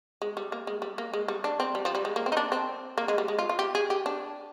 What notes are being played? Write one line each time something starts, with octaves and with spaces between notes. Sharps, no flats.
G#3
G3
A#3
G#3
G3
A#3
G#3
G3
D4
C4
G3
F3
G3
G#3
A#3
C4
D#4
D4
C4
A#3
G#3
G3
G#3
F4
F4
G4
G#4
G4
D4